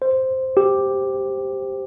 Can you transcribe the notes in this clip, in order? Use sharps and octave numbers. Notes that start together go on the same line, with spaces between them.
C5
G4